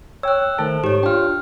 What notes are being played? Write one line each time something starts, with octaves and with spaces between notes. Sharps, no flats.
C#5 G5 E6 F#6
D#3 A3 A4 C5 A5
G#2 G4 C#5
D4 F4 G5 F6